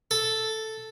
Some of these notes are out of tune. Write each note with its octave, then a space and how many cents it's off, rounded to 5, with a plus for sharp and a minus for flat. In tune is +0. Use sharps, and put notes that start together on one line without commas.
A4 +0